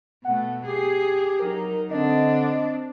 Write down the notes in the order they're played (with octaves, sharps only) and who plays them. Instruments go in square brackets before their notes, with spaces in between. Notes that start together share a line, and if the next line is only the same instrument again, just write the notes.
[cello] B2 A3 [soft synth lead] F#5
[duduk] G4 [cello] G#4 [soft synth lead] C7
[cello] F#3 D#4 [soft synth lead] A#4
[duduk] D3 [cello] C4 D4 [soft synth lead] D#5